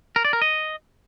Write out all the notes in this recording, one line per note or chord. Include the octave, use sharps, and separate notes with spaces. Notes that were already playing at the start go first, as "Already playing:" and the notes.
A#4
D5
A#4
D#5